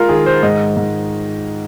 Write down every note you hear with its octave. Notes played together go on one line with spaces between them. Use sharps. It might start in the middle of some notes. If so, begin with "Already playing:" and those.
Already playing: G#3 F4 A#4
D#3 G#4
C5
G#2 D#5
G#2